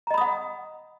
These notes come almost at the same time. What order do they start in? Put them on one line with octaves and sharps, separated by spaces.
A#5 D#5 B5 D#6 F#5